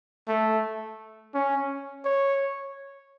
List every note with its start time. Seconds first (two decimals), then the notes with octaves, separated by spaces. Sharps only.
0.28 A3
1.34 C#4
2.05 C#5